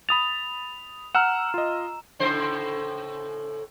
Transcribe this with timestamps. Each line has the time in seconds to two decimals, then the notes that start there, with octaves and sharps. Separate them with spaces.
0.09 B5 D#6 A6 F7
1.15 F#5 A#5 E6 F6 E7
1.54 F4 D#5
2.19 A2 C#3 C5